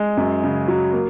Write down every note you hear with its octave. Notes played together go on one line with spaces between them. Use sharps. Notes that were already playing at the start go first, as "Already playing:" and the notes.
Already playing: G#3
F#2
C#3
F#3
A#3